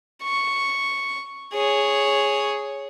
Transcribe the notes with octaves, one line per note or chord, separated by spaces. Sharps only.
C#6
G#4 C#5